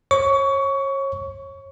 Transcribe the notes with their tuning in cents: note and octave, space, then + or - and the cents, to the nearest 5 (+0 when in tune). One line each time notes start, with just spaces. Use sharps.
C#5 -30 C#6 +20